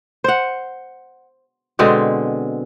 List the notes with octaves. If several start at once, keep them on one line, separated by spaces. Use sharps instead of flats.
C5 F#5
B2 D3 G#3 C4